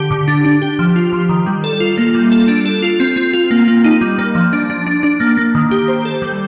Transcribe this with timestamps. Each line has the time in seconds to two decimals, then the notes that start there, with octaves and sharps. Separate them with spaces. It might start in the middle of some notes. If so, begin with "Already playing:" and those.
Already playing: D3 G4
0.11 D3
0.28 D4
0.45 D4
0.62 G4
0.79 F3
0.96 F4
1.13 F3
1.29 D#3
1.46 G3
1.64 A4
1.80 F4
1.98 A#3
2.15 G3
2.32 A4
2.48 D4
2.66 A4
2.82 F4
3.00 C4
3.16 C4
3.33 F4
3.51 A#3
3.68 A#3
3.84 D#4
4.01 G3
4.18 A#3
4.35 F3
4.53 D4
4.70 D4
4.86 D4
5.03 D4
5.20 A#3
5.37 A#3
5.55 D#3
5.71 G4
5.88 C5
6.05 A4
6.22 G3